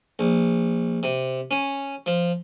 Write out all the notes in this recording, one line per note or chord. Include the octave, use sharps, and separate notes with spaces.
A#1
C3
C#4
F3